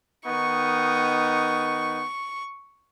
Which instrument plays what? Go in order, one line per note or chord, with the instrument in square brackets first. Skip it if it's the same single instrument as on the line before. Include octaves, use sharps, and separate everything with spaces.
[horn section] D#3 B3 D#4 [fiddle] C#6